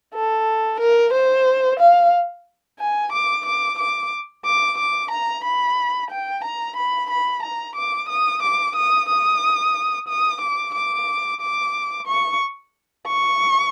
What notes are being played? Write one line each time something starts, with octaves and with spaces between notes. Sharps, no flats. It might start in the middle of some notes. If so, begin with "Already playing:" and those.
A4
A#4
C5
F5
G#5
D6
D6
D6
D6
D6
A#5
B5
G5
A#5
B5
B5
A#5
D6
D#6
D6
D#6
D#6
D#6
D6
D6
D6
C#6
C#6